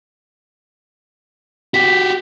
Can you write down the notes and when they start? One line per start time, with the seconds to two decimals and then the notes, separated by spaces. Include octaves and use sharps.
1.74 F#4 G4 B6